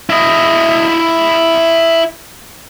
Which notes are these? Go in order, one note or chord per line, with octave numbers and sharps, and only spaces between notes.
E4 D#5